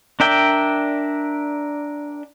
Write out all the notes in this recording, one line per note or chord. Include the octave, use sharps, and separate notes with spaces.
D4 A#4 D5 E5 G5